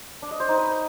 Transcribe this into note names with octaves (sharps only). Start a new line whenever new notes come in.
D4
D#5
C5
D#4
B4